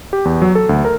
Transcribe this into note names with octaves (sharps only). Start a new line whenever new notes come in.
G4
E2
F#3
A4
D2
A#4